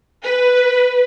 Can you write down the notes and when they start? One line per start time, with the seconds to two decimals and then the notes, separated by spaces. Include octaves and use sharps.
0.24 B4